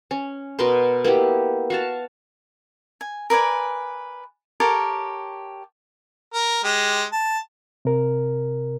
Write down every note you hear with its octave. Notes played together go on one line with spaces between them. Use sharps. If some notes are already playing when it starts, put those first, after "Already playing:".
C#4
B2 A#4 B4 C6
A#3 B3 E4 G4
F#4 F5 A5
G#5
A#4 B4 D5 G#5
G4 A4 A#4 C#5
A#4
G#3 G4
A5
C3 A#4